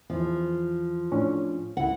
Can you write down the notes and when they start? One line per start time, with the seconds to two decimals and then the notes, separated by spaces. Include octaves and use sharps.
0.10 E2 E3 F3
1.12 A2 C#4 D4
1.77 C#2 C3 E4 F#5